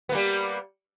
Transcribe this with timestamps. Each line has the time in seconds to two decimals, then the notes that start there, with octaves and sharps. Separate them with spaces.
0.09 B3
0.12 A#3
0.15 G3